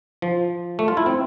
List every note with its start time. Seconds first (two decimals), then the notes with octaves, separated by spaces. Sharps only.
0.22 F3
0.79 A3
0.88 F4
0.97 E4
1.06 C4